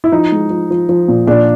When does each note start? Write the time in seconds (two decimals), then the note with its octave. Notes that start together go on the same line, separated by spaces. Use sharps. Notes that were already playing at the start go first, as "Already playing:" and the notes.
0.04 E4
0.12 F3 D#4
0.32 G#3
0.50 F3
0.70 F3
0.89 F3
1.08 A#2
1.27 A#2 D4